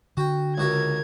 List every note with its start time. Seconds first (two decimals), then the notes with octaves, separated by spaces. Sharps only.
0.17 D3 F#4 G5
0.58 C#2 F#4 A#4 E5 G#6